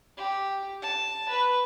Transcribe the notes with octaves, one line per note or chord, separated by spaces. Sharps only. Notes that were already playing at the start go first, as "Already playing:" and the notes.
G4
A5
B4